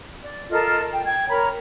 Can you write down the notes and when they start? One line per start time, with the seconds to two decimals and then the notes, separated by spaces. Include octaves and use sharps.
0.23 D5
0.51 F4 A4 A#4 D#5
0.93 G5
1.06 G5 G#6
1.29 A#4 C#5 A#5 B5